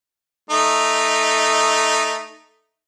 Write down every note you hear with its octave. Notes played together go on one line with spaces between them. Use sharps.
A3 D#4